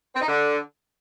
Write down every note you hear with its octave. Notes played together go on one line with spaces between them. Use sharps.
C4
D#4
D3